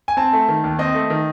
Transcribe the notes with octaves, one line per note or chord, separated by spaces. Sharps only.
G#5
C4 A5
A3
D#3
D#2
C4 D#5
A3
D#3